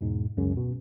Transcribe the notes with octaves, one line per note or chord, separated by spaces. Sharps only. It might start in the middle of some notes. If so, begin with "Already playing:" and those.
E2 G#2 B2
C#2 F#2 C#3
B2